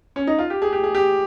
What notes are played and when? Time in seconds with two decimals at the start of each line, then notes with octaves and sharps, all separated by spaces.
0.16 C#4
0.27 D#4
0.39 F4
0.50 G4
0.62 G#4
0.73 G4
0.84 G#4
0.95 G4